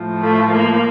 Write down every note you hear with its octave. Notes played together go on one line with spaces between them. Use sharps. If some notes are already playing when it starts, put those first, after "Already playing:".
Already playing: A2 F3
A3
A#3